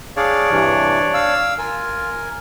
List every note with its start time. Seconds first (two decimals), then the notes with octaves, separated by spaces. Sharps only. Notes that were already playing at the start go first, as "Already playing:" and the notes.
0.17 D4 G#4 C#5 D5 F5
0.50 G2 C3 E3
1.14 F5 E6
1.58 F4 A#4 G#5